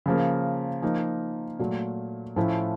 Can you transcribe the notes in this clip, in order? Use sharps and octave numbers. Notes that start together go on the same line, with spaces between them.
C#3 F3 A#3
F3 A#3 D#4
A#2 F#3 A3
A2 F3 A3 C#4 E4